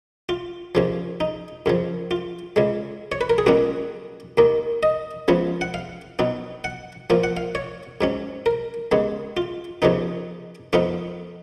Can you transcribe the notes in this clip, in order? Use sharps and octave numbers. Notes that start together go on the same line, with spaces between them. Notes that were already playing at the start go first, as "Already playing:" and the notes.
F4
D#2 C#3 F3
D#4
F#2 C#3 F3
F4
C#2 C#3 G#3
C#5
B4
A#4
G#4
C#2 B2 F#3 A#3 C#4 F#4
D#2 D#3 A#3 D#4
D#5
C#2 C#3 F3 B3
F#5
F5
B2 F#3 B3 D#4
F#5
A#2 F3 A#3 F5
F#5
F5
C#5
G#2 F#3 C#4
A#4
D#2 C#3 G#3 B3
F4
D#2 C#3 F3 B3 D#4
F2 F3 B3 D#4 F4